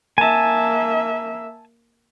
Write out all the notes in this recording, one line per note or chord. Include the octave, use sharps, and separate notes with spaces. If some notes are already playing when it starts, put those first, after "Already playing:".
A#3 E5 G#5 A5